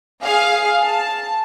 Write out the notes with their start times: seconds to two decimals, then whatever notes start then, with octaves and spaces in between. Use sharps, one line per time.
0.23 G#4 F5
0.83 A5